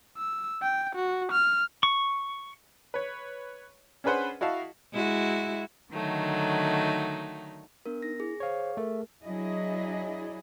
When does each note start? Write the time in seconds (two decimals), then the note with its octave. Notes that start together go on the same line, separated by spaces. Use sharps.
0.18 E6
0.62 G5
0.95 F#4
1.32 F6
1.83 C#6
2.94 B4 C#5
4.04 C#4 D4 G#4 B4 C5 F#5
4.41 E4 F#4 D#5 F5 A5
4.93 G#3 E4 F#4
5.91 D3 D#3 F#3 A3 D#4
7.86 B3 D4 A#4
8.02 D#4 A#6
8.20 E4 G#4
8.40 C5 C#5 F5
8.77 A3 A#4
9.24 F#3 D4 E4 G#4 D#5